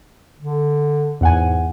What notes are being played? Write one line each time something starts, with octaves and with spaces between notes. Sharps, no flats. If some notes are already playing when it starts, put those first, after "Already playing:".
D3
E2 G#2 F#5 G#5